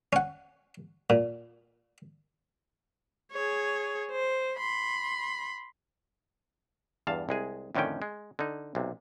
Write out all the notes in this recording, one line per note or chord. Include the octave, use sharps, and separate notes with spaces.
C#4 F#5
A#2
G#4 C#5
C5
B5 C6
E2 G2 F5 A5
C2 G#3 G#4
F2 A2 D3 D#3 C#4 G5
G#3
D3 D#4
B1 C3